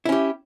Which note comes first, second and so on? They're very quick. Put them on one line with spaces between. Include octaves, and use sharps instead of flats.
E4 C#4 G4